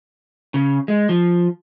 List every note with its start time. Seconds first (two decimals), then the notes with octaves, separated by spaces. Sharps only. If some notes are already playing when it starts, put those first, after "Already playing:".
0.54 C#3
0.88 G#3
1.09 F3